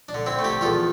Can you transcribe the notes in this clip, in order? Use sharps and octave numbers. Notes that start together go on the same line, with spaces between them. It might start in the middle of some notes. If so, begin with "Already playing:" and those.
D4
D3
C4 E4
A3
E4 G4
E2 F4 A4